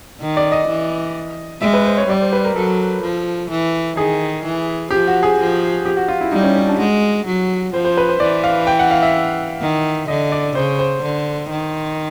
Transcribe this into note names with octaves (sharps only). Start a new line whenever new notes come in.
D#3
D5
D#5
E3
G#3 E5
B4
C5
C#5
G3 D5
C5
B4
A#4
F#3 A4
F3
E3
D#3 G#4
E3
F3 G4
F#4
G#4
F3
G4
F#4
F4
E4
G3 D#4
C#4
C#4
D4
G#3 F#4
F#3
F3 C5
C5
B4
C5
E3 D5
F5
G5
F#5
F5
E5
D#3
D3 D#5
D5
C#3 C5
C5
D3
D#3